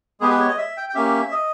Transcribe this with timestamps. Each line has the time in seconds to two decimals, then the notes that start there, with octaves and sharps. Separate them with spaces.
0.21 G#3 B3 G4 G#4
0.30 B4
0.40 C#5
0.48 D#5
0.58 E5
0.77 G5
0.89 G5
0.94 A#3 C#4 G4 E5
1.31 D#5